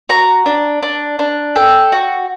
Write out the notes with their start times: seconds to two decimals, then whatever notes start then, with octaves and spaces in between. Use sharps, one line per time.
0.09 F#4 A#5
0.46 D4
0.83 D4
1.19 D4
1.56 A4 G5
1.92 F#4